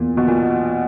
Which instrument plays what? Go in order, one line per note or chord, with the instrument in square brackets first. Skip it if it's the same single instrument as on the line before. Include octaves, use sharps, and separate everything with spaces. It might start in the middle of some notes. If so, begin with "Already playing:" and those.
Already playing: [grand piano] E2 A#3 [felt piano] A#2
[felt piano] B2
A#2